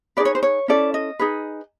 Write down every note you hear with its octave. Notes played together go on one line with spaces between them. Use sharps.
D#4 G#4 B4 D5
C#5
C5
C#5
C#4 E4 A4 D5
D#5
D#4 G#4 B4